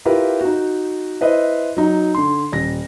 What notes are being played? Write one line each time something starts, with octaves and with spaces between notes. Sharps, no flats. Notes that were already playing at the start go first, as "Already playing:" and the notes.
E4 F4 G4 A#4 B4
D#4 F#4
E4 B4 C5 D#5
F#3 D#4
D3 C6
D#1 A#6